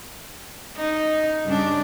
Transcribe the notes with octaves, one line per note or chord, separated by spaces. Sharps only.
D#4
G2 C#3 G3 D4